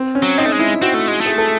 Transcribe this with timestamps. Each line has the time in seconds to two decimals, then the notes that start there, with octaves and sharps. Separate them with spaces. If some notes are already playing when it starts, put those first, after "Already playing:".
Already playing: C4
0.15 C#4
0.23 F#3
0.38 C4 D#4
0.46 A3
0.52 G#3
0.60 E4
0.82 C4 F#4
0.94 A3
1.08 G#3
1.21 A3
1.26 G#4
1.38 A4